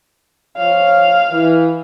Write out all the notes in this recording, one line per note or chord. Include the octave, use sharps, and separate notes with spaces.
F3 F4 C#5 F5
E3